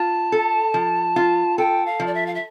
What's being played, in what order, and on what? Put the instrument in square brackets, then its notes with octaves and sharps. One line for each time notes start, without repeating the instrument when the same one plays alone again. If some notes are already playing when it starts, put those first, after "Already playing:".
Already playing: [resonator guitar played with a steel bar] F4 [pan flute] A5
[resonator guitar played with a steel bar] A4
F3
F4
[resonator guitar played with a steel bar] A4 [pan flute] G5
[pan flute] F5
[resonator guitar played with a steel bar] F3
[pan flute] D5
E5
F5
E5